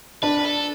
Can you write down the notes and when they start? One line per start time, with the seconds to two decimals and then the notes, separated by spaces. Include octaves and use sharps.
0.23 D4 B4
0.45 A4